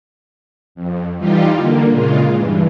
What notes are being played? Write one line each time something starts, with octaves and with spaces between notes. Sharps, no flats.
F2
E3 G3 D#4 F4 G4
D3 A#3
A#2 C#3 G#3 F4
G2 E3